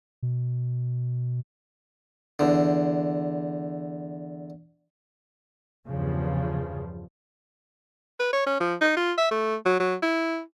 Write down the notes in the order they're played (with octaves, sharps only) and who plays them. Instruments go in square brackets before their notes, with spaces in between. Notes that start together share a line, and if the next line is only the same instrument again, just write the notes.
[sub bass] B2
[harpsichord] E2 D3
[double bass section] E2 G2 C#3 F3
[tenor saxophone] B4
C#5
C#4
F3
D#4
F4
E5
A3
F#3
F#3
E4